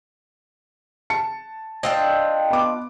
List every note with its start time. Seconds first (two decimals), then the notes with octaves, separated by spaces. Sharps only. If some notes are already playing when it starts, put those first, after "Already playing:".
1.10 A5 C#7
1.83 C4 D4 F4 D#5 G5
2.51 B3 D6